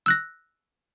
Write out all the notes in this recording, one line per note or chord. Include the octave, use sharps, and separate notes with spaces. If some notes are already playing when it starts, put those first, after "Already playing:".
E6 F#6 A#6